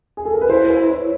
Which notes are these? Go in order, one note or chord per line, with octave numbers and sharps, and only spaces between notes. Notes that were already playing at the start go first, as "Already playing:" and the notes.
G#4
A4
A#4
B4
E4 C5
B4
C5
C#5